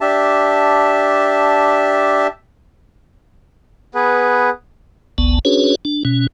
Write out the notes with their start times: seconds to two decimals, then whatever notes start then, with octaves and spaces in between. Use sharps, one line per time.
0.01 D4 G4 E5 A5
3.95 B3 G#4 B4
5.18 G1 C#2 B3 A5
5.45 C#4 D4 F#4 G#4 B4 C#5
5.85 D4
6.05 B2 C#4